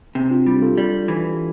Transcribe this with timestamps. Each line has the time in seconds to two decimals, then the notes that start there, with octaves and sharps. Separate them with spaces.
0.15 C3
0.30 D4 F4
0.46 G3 E4 G4
0.62 F4 A4
0.78 G3
1.08 E3